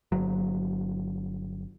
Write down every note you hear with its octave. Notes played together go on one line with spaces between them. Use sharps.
G1 F#3